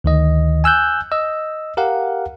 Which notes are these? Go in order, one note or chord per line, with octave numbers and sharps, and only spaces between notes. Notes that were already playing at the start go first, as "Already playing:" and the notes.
D2 D#3 D#5
G#5 E6 F#6 G6
D#5 E6
G4 A#4 F5 F#5